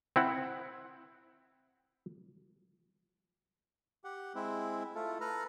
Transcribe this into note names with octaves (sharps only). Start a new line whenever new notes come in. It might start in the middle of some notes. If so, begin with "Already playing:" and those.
C4 E4 F#5
G4 F#5
G#3 C4 E4
A3 E4 F4 A4
A4 B4 A#5 F6